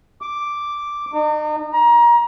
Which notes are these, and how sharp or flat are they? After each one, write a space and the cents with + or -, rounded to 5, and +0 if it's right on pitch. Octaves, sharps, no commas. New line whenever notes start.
D6 +0
D#4 -40
A#5 +25